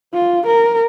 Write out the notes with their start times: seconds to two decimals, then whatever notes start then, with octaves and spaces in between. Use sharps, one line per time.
0.14 F4
0.47 A#4